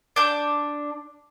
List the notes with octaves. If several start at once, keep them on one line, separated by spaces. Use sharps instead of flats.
D4 G6